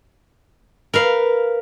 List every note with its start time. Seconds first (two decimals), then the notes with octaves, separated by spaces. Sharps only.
0.93 A#4 B4 F5